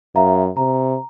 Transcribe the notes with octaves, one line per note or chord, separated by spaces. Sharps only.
F#2 E5 F5 A#5
C3 A#5